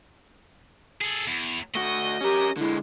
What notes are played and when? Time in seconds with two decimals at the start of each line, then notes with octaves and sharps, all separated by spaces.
1.01 G#4 A4
1.28 E2
1.75 A3 F#4 D#5
2.21 C#4 G4 A#4
2.57 D3 G#3 E4